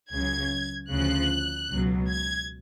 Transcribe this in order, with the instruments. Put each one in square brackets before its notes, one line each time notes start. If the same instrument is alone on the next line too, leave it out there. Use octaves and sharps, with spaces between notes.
[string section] C#2 C#3 F#3 G#6
D2 C#3 F3 F#6
C#2 B2 F#3
G#6